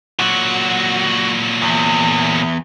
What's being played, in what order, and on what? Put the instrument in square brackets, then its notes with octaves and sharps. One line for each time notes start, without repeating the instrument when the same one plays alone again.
[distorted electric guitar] A#2 F#3 [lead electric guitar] F#4
[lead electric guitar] E2